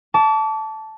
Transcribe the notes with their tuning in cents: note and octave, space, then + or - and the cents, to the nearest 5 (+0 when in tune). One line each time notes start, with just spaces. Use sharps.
A5 -5 D6 -40